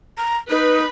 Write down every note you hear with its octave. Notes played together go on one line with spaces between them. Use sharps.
A#5
D#4 B4 B5